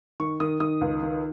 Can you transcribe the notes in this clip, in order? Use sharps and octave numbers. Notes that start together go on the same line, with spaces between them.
D#3 C#6
D#3 D#6
D#3 D#6
C#2
D#3